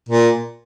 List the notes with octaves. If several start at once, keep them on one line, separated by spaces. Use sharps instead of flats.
A#2